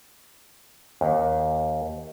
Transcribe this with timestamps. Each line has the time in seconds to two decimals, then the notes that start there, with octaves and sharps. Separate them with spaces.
1.01 D#2